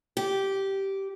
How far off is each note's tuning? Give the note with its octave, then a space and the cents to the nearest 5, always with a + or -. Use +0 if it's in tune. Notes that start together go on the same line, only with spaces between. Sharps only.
G4 -10